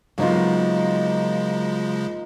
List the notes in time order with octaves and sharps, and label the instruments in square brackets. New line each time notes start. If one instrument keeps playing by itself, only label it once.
[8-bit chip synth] C#3 F3 G#3 [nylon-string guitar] F#3 B3 [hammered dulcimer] A#3 D#4 F4